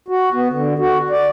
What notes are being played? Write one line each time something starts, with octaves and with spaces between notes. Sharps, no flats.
F#4
B3
D3
F#4
D5